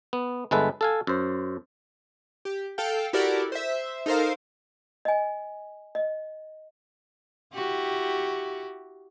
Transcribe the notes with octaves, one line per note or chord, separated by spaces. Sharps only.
B3
G1 G#3 A4 B4 E5
A4 F5 G#5
F#2 C5
G4
A4 F5 G5
E4 F#4 G4 A4 A#4 D5
C5 E5
D#4 A4 A#4 C5 F5
D#5 G#5
D#5
E4 F#4 G4